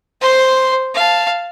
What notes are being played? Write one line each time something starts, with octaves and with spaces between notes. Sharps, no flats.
C5 C6
F5 A5